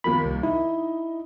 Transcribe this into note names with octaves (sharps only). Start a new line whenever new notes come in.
D#2 F3 A#3 B5
C2
D#4 E4